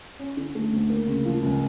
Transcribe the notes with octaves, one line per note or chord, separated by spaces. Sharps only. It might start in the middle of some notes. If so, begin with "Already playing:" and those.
C#4
D3
A3
D2
A#3
C#3
F3
C#2